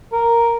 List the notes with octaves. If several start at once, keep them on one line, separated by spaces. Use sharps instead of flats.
A#4